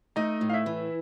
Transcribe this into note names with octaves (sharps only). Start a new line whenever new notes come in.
A3 D#4 D#5
A2
F5
E4 E5
E3